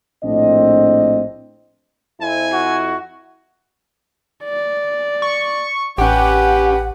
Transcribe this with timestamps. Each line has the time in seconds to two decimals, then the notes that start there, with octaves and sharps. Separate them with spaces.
0.23 A#1 A2 A3 C4 D4 D#5
2.21 F2 C4 E4 G#5
2.53 F#4
4.44 D5
5.22 C#6
5.98 A1 C#4 G4 B4 F#5